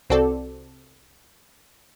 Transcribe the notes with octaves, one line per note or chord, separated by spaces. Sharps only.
C2 C4 F#4 A4 D5